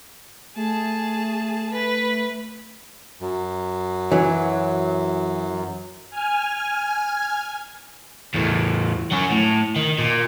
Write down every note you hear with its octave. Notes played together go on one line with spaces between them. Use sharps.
A3 G#4 A5
B4
F#2
E3 F#3
G#5 F6
E2 A2
F#3 C#4
A2
D#3
A#2